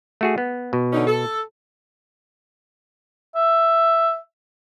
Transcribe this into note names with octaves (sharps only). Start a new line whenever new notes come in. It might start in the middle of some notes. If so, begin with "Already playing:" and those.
A3 F#4 G#4
B3
B2
D3 C#4 D#4
A4
E5